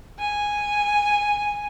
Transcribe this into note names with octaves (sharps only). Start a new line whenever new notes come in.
G#5